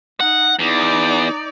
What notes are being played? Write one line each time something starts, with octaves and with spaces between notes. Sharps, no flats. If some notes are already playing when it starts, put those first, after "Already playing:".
D#4 F#5
E2 D#4 D5